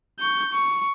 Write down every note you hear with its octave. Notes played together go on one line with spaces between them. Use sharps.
C#6 G6
C#6